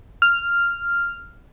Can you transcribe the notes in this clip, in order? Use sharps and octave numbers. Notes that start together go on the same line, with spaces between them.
F6